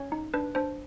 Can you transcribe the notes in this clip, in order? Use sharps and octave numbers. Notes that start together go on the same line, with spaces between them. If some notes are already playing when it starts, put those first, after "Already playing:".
Already playing: C#4 C#5
D#4
D4 B4
D4 C5